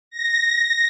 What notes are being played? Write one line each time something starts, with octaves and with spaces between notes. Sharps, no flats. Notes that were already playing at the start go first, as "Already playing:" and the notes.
A#6